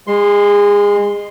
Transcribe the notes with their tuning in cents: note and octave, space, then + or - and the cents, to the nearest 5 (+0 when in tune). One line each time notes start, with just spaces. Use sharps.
G#3 -25 C6 +0